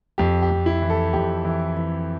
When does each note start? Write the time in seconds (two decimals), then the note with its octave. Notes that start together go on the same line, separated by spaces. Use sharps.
0.18 F2 G4
0.42 G4
0.50 F2
0.66 E4
0.82 E3
0.90 A4
1.13 F2 G4
1.45 E3
1.77 E3